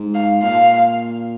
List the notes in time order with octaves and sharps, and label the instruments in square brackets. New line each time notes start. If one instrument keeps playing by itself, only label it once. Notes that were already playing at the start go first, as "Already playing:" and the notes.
Already playing: [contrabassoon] G#2
[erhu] F5
[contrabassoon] A#2 [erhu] F5